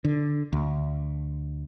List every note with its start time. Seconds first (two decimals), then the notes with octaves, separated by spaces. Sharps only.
0.04 D3
0.53 D2